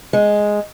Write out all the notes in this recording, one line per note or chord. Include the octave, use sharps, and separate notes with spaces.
G#3